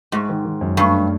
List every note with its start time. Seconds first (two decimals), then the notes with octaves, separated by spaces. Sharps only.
0.12 G#2 G#3
0.29 D#3
0.45 D#3
0.61 F#2
0.77 G2 A3
0.94 A3